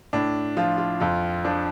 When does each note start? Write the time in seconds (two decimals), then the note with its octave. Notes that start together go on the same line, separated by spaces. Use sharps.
0.13 A2 D4
0.57 F3 F4
0.78 F4
1.00 F2 F4
1.44 F3 D4